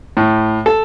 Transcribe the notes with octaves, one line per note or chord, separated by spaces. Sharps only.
A2
A4